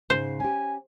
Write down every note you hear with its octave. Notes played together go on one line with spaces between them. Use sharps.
G#2 C#3 C5
C#4 G4 G#5